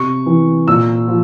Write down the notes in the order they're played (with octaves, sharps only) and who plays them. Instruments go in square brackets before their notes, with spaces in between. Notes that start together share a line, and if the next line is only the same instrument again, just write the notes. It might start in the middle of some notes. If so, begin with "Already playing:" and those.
Already playing: [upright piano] C3 C#6
E3
A#2 E6
F3